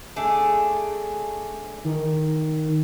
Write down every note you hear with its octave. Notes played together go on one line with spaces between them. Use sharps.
A3 D4 G#4
D#3